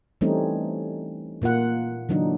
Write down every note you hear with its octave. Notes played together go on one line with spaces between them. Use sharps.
E3 G3 A3 C4 C#4 D#4
A#2 A#3 F4 F#5
D3 E3 F#3 D4 D#4